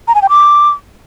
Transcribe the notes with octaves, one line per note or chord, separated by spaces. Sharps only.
A#5
G#5
G5
D6